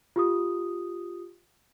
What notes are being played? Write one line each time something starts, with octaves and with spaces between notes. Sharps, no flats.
F4 G4 D#6